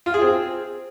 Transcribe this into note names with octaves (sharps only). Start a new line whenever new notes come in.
F4
G#4
C4